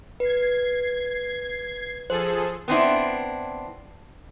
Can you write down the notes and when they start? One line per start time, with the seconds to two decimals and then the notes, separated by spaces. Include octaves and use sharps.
0.20 B4 G#6 C7
2.10 F3 G#4 A4 C5
2.68 B3 C4 D4 E4